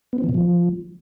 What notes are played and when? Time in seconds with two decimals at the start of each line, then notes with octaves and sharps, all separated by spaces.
0.13 B3
0.18 C4
0.24 E3
0.29 B2
0.34 F3